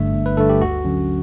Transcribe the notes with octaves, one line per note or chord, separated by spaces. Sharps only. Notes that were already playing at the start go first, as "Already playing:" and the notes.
Already playing: G1 G2 D3 A3 E5
G1
B4
G2 D3 A3 A4
G4
D2 F#4
D3 F#3 C#4